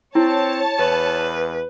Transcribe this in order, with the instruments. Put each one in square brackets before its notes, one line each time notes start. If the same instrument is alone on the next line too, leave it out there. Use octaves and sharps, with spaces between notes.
[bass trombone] C4 [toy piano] E4 [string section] C#5 A5
[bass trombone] E2 [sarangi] B4